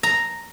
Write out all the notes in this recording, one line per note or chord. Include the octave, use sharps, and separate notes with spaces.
A#5